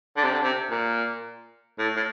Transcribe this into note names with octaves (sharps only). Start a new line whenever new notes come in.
D3
C3
D3
C3
A#2
A2
A2